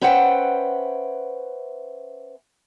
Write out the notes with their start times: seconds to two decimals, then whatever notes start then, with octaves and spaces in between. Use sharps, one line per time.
0.01 C#4 B4 C5 E5 F#5 G5